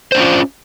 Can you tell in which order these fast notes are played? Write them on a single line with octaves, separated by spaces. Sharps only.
C5 D4 C#4 F4